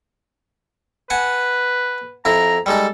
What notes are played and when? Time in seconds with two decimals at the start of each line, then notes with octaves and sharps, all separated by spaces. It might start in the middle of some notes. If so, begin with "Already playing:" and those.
1.10 B4 F#5 G#5 A5
2.25 F2 E4 A#5
2.66 G3 G#3 D#4 A4